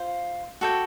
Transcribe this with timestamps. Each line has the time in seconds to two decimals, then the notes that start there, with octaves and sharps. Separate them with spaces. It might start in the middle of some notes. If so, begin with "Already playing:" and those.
Already playing: F4 C5
0.61 F#4 A4 D5 G5